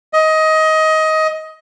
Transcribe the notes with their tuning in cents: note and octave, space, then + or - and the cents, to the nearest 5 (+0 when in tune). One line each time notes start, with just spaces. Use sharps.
D#5 +20